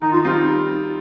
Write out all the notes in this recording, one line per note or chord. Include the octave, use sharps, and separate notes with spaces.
D#3 D#4
F4
D#4
G3 C4 F4